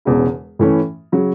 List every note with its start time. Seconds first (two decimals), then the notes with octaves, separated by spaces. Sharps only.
0.05 E1 E2 C#3 G#3
0.59 A2 E3 A3 C#4
1.12 C#3 F#3